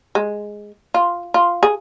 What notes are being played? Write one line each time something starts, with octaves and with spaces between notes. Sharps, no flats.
G#3
F4
F4
G#4